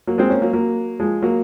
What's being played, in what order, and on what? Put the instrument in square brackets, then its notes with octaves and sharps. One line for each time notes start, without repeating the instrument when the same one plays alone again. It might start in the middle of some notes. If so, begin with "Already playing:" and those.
[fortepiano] F#3 A#3
G#3 C4
A#3 C#4
F#3 A#3
F#3 A#3
F3 G#3
F#3 A#3